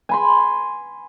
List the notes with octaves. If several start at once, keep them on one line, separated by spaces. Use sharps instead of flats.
G#5 B5 C6